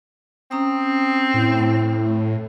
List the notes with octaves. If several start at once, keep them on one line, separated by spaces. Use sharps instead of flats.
C4 C#4 A#5 D#6
A2 E4